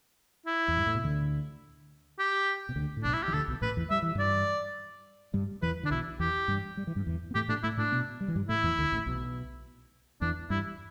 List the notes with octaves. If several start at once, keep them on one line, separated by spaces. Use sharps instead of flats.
E4
E2
G2
A2
B2
D2 D3
G4
B2
D2 D3
A2
B1 B2 D4
E4
E3 G4
D2 D3 A4
B1 B2
A1 A2 B4
E2 E3
G3 E5
E3
G2 G3 D5
G2 G3
E2 E3 B4
D3 D4
B1 B2 E4
E2 E3 G4
G2 G3
G3
E3
G2 G3
E2 E3
B3
A2 A3 G4
A2 A3 D4
A2 A3 E4
A2 A3 D4
B2 B3
G3
E3
G2 G3
A2 A3 E4
E2 E3
D2 D3
A1 A2
B1 B2
E2 E3 D4
G2 G3 E4